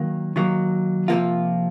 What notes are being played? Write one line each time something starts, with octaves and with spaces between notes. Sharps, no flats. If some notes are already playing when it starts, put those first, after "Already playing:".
Already playing: D#3 F#3 A#3
D#3 F#3 A#3
C3 F3 A#3 F4